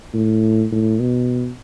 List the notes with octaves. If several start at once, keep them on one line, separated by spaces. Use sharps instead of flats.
A2
A2
B2